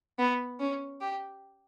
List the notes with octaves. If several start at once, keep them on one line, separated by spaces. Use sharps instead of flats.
B3
C#4
G4